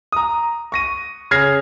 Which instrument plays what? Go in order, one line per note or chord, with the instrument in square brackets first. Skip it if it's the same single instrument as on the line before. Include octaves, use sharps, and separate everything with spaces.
[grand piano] A#5 D#6
C#6 A#6 D#7
C#3 F6 G#6 A#6 C7